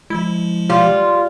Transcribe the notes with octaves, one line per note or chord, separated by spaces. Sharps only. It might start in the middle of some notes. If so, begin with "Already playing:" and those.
F3 G#3 E4
G3 F4 G4